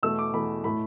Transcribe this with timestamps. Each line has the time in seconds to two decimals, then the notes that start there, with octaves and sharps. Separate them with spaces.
0.03 E2 B2 A3 E6
0.19 D6
0.33 E2 B2 A3 B5
0.64 A2 A3 B5